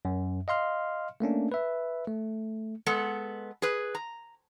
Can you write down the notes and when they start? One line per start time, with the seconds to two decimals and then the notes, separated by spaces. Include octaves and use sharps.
0.05 F#2
0.48 D#5 F5 C6 F6
1.20 A3 A#3 C#4 D4
1.52 B4 E5
2.07 A3
2.86 G#3 B3 A4
3.62 G#4 B4
3.95 A#5